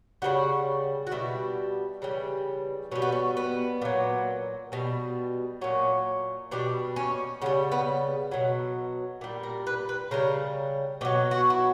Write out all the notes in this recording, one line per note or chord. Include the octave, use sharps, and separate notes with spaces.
C#3 E3 G3 F#4
F#4
B2 G3 E4
C#3 E3 G3
B2 G3 C#4
B3
C#4
B3
A#2 F#3
B2 G3
A#2 F#3 C#4
B2 G3 D4
C#4
C#3 G3 B3
B3
B2 F#3
A#2 G3
A#4
B4
B4
C#3 G3 A#4
B2 F#3 G4
F#4
E4